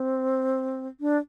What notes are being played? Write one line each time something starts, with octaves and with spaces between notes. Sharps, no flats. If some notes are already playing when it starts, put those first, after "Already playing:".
Already playing: C4
D4